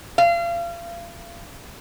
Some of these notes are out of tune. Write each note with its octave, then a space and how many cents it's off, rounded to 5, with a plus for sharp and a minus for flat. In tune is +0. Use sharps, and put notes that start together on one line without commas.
F5 -35